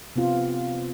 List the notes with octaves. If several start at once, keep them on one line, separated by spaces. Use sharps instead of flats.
C3 B3 C4 F4